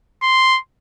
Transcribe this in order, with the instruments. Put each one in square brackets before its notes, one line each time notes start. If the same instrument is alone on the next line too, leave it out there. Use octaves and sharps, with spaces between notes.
[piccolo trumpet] C6